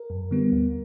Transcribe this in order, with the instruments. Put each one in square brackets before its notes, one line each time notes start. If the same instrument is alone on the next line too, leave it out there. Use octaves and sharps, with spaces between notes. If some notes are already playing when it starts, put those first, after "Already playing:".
Already playing: [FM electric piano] A#4
F#2
D3 G3 B3
D2